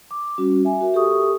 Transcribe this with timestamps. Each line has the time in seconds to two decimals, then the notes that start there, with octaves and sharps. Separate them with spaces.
0.11 D6
0.38 G3 C#4 F#4
0.65 E5 G#5
0.81 F#4 A#4 E5
0.94 G4 A4 A#4 C#6 D#6